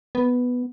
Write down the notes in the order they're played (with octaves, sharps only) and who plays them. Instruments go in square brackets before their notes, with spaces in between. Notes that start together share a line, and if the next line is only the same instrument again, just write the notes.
[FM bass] B3